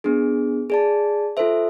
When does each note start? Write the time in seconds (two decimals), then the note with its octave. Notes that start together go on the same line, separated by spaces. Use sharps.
0.04 B3 D4 G#4
0.70 G#4 D5 A5
1.37 F4 A4 C5 E5